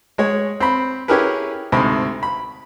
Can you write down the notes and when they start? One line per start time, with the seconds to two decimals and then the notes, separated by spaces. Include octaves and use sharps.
0.18 G#3 C#5
0.60 C4 B5
1.08 C#4 E4 G4 G#4 A#4 B4
1.72 D2 G#2 C3 B5
2.23 B5